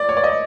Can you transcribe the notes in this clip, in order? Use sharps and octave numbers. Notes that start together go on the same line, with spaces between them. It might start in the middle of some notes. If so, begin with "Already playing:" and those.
Already playing: D5
C#5
D5
D#5